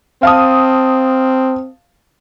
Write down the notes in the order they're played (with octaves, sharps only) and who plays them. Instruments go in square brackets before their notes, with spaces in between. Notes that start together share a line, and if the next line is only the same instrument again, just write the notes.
[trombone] C4 [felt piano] F5 A5 D#6